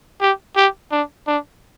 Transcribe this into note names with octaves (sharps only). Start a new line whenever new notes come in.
G4
G4
D4
D4